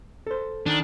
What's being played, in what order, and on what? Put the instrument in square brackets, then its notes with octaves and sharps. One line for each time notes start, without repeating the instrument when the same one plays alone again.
[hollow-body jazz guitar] A4 C5
[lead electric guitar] D#3 [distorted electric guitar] D4